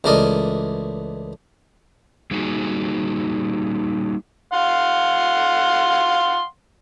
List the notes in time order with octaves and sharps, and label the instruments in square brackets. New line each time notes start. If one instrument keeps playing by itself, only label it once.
[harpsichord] C#2 E3 A3 A#4 D5 D#5
[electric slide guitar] G3 A#3 D#4 F#4 G#4
[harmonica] F5 F#5 C6